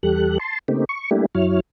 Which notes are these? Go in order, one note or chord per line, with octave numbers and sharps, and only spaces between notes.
E2 G3 G4 A4 F#6
A5 C6
C#3 A3 A#3 C4 D#4 G4
C#6
G3 A3 A#3 D4 E4 G4
F#2 F#3 E4 C#5 F6